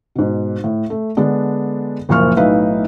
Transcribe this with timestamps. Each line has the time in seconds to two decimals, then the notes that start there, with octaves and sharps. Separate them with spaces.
0.16 G#2 B2
0.64 A2
0.90 A3
1.17 D3 G#3 B3 D4
2.09 F#1 A#2 F3 C#6 F6
2.37 B1 A2 D#4 B4 E5 F5